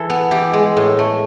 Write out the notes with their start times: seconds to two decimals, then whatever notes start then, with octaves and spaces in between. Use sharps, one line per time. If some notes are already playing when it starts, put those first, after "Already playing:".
Already playing: E3 A4
0.10 B3
0.31 E3 G4
0.53 G#3
0.77 A2
0.99 A3